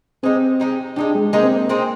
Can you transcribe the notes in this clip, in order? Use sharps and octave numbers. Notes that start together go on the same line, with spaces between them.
G#3 C4 D#4 G4
G#3 D#4 G4
G#3 D4 D#4 G4
G#3
G#3 A#3 D#4 G4
C4
A#3
G#3 C4 D#4